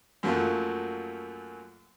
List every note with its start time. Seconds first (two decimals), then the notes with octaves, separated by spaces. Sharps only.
0.23 F#2 F3 F#3 A3 A#3 F4